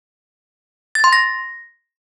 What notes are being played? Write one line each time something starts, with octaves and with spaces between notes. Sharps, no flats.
A6
C6
A#6